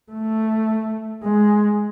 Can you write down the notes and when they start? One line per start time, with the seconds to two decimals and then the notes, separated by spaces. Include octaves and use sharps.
0.12 A3
1.24 G#3